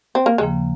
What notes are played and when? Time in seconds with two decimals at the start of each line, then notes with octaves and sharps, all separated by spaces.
0.15 C4
0.26 A#3
0.38 D#2 C#3 F3 G#3 A#3